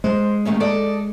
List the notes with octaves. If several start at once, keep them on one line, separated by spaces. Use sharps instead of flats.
G#3 C5
D#2 A3 C#4
A4 D5 D#5